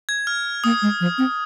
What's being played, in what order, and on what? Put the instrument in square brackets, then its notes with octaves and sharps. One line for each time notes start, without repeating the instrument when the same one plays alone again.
[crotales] G#6
F6
[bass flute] A#3 [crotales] D#6
[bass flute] G#3
F3
C4